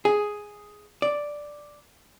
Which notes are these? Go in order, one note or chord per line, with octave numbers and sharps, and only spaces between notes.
G#4
D5